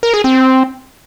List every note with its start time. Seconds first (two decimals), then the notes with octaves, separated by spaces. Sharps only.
0.03 A#4
0.14 G#4
0.24 C4